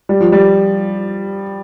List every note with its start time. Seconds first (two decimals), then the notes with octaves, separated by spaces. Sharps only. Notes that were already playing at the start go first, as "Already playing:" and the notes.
0.09 G3
0.20 F3
0.32 G3